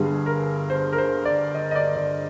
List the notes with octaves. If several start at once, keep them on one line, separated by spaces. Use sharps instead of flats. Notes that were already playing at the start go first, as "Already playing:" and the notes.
Already playing: G1 G2 D3 G3 G#4
A#4
C5
A#4
C5
D5
D#5
D#5
D5
D5